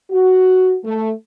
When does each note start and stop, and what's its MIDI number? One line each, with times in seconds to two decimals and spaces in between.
0.11 0.75 66
0.84 1.11 57